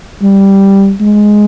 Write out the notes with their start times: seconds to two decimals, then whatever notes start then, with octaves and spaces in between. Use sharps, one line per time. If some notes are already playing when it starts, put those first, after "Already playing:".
0.22 G3
1.00 G#3